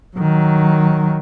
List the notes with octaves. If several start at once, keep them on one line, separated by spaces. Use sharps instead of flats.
D#3 F#3